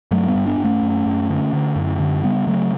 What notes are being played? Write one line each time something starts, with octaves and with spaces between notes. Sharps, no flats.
G2 F#3 A3
G3 B3
G2
B3 D4
G2
A3 C#4
F#2
F#2
D3
D3
F#2
D3
C#3 G3 B3
C#3 F#3 A3